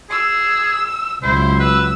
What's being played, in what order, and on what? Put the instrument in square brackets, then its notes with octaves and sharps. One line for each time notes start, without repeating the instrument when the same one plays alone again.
[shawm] G#4 [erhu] E6
[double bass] C#2 F#3 [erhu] E4 [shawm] C5
[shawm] B4 [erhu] E6